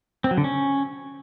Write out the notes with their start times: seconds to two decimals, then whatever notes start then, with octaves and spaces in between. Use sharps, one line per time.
0.24 C4
0.31 F#3
0.38 D3
0.44 C#4